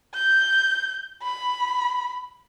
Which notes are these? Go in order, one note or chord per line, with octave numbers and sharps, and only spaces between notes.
G6
B5